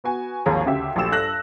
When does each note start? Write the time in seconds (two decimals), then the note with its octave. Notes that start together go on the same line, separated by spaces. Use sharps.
0.04 B3 F#4 G#5
0.46 G#1 D#2 F3 G#4 C#5 A#5
0.66 D2 C#3 G4 E5
0.96 A#1 A3 G4 E6 E7
1.11 G2 A4 F#6 A#6 F#7